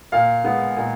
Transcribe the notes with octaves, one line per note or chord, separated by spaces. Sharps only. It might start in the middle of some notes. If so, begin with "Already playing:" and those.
A#2 F5
G#3 B3
A#2